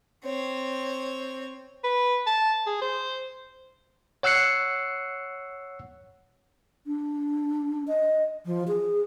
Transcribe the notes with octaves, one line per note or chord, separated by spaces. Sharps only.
C4 C#5
B4
A5
G#4
C5
C#5 F#5 E6 F#6 C7 C#7
D4
D#5
F3
G#4